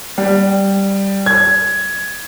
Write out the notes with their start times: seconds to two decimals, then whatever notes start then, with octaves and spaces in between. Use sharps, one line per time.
0.18 G3
1.26 G#6